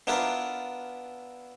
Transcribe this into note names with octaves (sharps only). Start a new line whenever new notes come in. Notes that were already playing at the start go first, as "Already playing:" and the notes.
B3 D4 E4 F4 A#4 B4